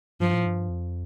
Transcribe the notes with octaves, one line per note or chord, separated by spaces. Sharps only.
G2 F3
A2
G2
F2